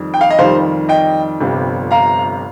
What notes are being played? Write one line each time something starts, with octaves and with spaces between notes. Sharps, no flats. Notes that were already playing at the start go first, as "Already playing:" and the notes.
Already playing: F2 D#3 G3
G5
F5
D#5
F2 D#3 G3 C5 F5
D#5 G5
G1 F2 C3 G3
F5 A#5